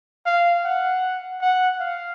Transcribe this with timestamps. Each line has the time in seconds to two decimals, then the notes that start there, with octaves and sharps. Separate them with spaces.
0.26 F5
0.64 F#5
1.41 F#5
1.80 F5